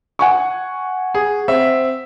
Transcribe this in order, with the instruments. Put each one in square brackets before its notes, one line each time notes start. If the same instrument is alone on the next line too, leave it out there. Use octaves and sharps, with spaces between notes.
[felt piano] F#5 G#5 C#6
[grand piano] G#4
C4 E5